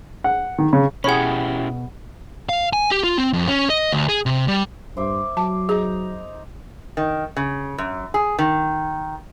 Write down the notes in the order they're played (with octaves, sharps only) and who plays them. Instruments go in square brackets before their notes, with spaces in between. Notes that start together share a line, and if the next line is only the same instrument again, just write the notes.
[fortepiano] F#5
D#3
C#3
[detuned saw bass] B2 [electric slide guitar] C#4 E4 G4 [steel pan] G#4 C#5 [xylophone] F#5 B5
[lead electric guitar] F5
G#5
G4
F4
C4
F2
C#4
D#5
D2
G#4
C3
G3
[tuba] G2 [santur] C5 E5 D6
[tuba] F#3 [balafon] A5 [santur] D6
[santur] D#4 A#5 [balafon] G#4
[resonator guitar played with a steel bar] D#3
C#3
F#2
G#4
D#3